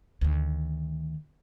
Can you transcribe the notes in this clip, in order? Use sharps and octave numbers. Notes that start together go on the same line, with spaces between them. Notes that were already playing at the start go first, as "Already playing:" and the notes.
D2 D#3